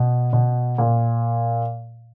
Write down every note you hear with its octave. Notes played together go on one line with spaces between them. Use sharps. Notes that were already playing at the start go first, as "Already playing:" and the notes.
Already playing: B2
B2
A#2